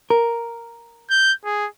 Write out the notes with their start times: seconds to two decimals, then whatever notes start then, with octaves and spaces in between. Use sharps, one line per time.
0.10 A#4
1.10 G6
1.45 G#4